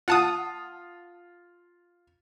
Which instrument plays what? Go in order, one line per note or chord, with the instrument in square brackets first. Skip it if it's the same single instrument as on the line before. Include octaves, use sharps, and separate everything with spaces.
[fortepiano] F4 [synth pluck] F#5 A5 D#6